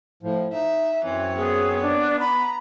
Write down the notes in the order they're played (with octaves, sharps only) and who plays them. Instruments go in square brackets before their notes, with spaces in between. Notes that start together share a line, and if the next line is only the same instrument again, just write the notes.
[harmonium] A2 F3
[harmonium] D#4 [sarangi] E5
[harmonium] F#2 C4 C#5 [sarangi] E3
[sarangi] B3 [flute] G#4
[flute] D4
[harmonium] A#5 [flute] B5